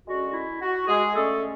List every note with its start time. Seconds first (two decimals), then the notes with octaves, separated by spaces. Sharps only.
0.06 D3 G#3 C#4 F#4
0.34 E4
0.61 F#4
0.88 G#3 G#4
1.15 D3 G#3 A3 C#4 A4